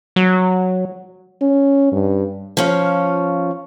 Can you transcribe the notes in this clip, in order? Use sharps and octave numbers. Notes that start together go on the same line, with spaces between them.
F#3
C#4
G2
F3 C#4 F4